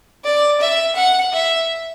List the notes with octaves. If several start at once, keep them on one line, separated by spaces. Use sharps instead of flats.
D5
E5
F#5
E5